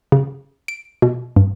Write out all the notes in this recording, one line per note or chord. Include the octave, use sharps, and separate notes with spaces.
C#3
D7
B2
G2